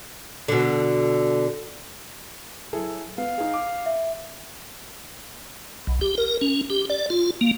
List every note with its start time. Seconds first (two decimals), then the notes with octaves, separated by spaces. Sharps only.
0.48 B2 D3
2.73 F#3 E4 G#4 A4
3.18 B3 F5
3.38 D#4 G#4
3.54 D6
3.86 E5
5.87 B1
6.01 G4
6.18 A#4
6.41 C#4
6.70 G4
6.90 D5
7.10 F4
7.41 A#3